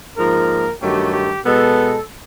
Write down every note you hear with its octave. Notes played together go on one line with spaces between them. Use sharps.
G#2 F3 A#3 D#4 A#4
G2 D#3 F#3 A3 G4
G4
B2 G#3 B3 A4